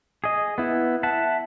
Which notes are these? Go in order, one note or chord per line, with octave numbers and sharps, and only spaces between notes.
G#4 D#5
B3 E4
E5 F#5 A5